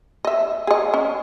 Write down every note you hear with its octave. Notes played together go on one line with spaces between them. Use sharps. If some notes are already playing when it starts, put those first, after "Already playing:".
D#5 E5
G#4 D#5
C#4